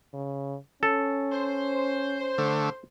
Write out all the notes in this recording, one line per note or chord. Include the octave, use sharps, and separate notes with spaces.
C#3
C#4 A4
C5
D3 A3